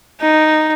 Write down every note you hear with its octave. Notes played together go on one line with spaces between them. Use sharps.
D#4